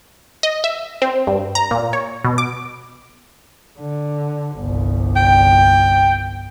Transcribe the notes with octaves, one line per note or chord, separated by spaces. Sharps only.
D#5
E5
C4
G2
A#5
A#2
C#5
B2
D6
D3
G1 C2
G5